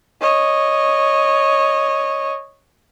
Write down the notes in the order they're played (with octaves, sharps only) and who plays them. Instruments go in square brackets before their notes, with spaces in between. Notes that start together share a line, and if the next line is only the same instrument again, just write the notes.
[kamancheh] C#5 D#5